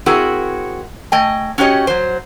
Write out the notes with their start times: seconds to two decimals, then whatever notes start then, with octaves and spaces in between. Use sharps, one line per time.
0.06 C4 E4 F#4 G#4 A#4
1.12 A3 D#5 G5 G#5
1.58 C#4 F#4 G4 C#5 D#5
1.87 F#3 C5